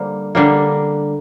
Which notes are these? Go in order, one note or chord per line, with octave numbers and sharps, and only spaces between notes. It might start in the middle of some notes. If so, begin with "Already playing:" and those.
Already playing: D3 G3 A#3 C5
D3 G3 A#3